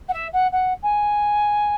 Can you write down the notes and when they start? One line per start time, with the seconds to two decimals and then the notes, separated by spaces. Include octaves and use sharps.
0.08 F#5
0.13 E5
0.33 F#5
0.52 F#5
0.82 G#5